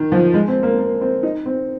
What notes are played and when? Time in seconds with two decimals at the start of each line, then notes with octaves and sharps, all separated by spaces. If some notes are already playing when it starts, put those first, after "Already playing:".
Already playing: D#3
0.12 F3
0.34 G#3
0.48 C4
0.63 A#3
0.79 A#3
1.01 C4
1.23 D#4
1.46 C4